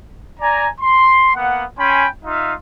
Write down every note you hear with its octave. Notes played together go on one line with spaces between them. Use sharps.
D5 G#5 A#5
C6
A#3 B3 F#5
C#4 G5 G#5 B5 C6
D#4 F4 E5 F5